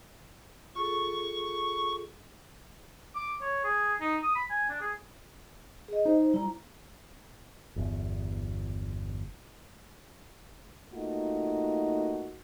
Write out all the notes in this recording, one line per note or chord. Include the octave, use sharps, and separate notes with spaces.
F4 G#4 A4 C#6
D6
C#5
G#4
D#4
D#6
B5
G#5
D4
G#4
G#4 D#5
D#4 C5
G3 E4 A#5
G1 E2
A3 A#3 D#4 F4 F#4